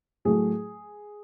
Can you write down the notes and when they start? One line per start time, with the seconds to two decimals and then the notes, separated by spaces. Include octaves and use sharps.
0.25 A2 F#3 A3 G#4